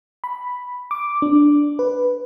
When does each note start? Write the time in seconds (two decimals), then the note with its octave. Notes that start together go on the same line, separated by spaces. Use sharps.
0.24 B5
0.91 D6
1.22 D4
1.79 B4